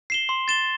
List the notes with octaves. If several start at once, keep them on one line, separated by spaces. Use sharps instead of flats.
C7 E7 G7
C6
A6 E7 G7